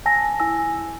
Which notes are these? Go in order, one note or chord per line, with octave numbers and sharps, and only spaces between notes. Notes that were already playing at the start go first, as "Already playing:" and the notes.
G#5 A5 E6 A#6
E4 G#5 E6